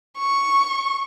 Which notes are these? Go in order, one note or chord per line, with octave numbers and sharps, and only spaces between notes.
C#6